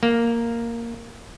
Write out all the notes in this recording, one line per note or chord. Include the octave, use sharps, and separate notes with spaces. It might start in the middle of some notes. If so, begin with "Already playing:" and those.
A#3